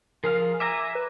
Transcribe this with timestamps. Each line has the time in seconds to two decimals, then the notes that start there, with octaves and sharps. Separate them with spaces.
0.24 F3 G#4 A#4 F5
0.60 E5 G#5 A#5 D6
0.95 B4